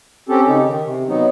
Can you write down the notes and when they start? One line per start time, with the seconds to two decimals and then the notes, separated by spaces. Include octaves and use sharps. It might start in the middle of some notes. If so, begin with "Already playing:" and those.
0.29 C4 C#4 G4 A4
0.48 C#3 D#4 G4
0.65 D#3
0.84 C3
1.08 F#3 B3 D#4